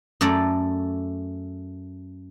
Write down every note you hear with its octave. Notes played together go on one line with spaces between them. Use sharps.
F#2 A3 A4 D5 A#5